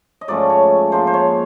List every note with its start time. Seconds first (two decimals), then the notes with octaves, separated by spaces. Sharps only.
0.21 D#5
0.28 G#2 F3 A3 C#4 D5
0.50 C#5
0.92 G#2 F3 A#3 C5
1.07 C5
1.14 C#5